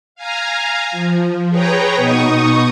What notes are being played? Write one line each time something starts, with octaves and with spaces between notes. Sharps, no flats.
F5 G#5 A#5
F3
G#4 B4 C#5 G5 A#5
B2 B3 D#4 C#6 D#6